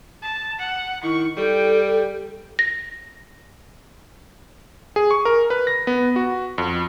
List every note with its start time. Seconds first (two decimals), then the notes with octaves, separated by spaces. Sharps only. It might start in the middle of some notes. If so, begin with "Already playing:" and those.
0.23 A5
0.59 F#5
1.03 D#3 E4 C#6
1.37 G3 A4 G5
2.59 A#6
4.96 G#4
5.11 C#6
5.25 A#4
5.50 B4
5.67 A#6
5.87 B3
6.16 F#4
6.58 F2